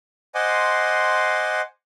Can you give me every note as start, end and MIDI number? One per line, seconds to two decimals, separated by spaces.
0.35 1.61 72
0.35 1.61 75
0.35 1.61 78
0.35 1.61 80
0.35 1.61 84
0.35 1.61 86